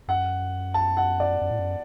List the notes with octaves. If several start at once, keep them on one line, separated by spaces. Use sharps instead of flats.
F#2 F#5
A5
F#5
D5
F#2
A2
F#2